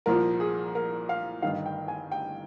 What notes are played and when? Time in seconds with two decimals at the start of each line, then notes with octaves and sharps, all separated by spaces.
0.06 C2 A#2 F3 A#4
0.40 G#4
0.75 A#4
1.09 F5
1.42 G1 G2 D#3 F5
1.66 G5
1.88 G#5
2.12 G5